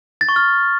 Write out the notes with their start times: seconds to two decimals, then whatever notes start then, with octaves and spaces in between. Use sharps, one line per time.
0.21 A6
0.29 C#6
0.36 F6